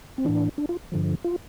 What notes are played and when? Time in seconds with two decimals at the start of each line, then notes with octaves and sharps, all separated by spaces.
0.18 C4
0.25 A2 E3 D4
0.58 D4
0.69 F4
0.92 G2 D3 F3
1.24 F4